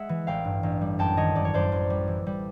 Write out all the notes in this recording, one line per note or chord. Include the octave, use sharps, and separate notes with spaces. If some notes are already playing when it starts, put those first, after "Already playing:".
Already playing: G#3 E5 F#5
E3
A1 F5 G5
G2
A1
G3
F#2 G5 A5
D#3 C#5 D#5
F#2 D5
C#5
F#2 C5 D5
F#2
G3
E3
G3